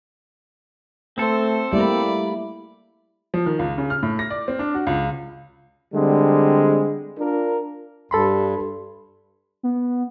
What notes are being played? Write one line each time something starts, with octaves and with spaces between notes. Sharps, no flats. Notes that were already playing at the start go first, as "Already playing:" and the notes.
A3 C4 A4 C5
G3 A3 A#3 E4 D5 B5
F3
D#3
C#2
C#3
F6
A2
A#6
D5
C4
D4
F#4
C#2
D3 G3 G#3 C4
D4 F4 A#4
G2 A4 B5 C6
B3